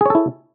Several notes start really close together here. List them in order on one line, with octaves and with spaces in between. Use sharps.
G#4 C#5 A4 E4